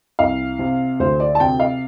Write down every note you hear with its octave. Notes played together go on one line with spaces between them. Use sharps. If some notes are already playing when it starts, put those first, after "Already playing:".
C2 F5
C3
D2 C5
D5
A5
C3 G5
F5